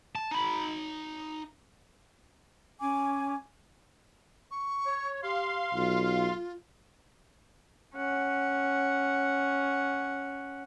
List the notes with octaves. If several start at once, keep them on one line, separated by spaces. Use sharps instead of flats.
A5
D#4 B5
C#4 G#5 D6
C#6
C#5
G4 F5 C6
B1 F4
C#4 F#5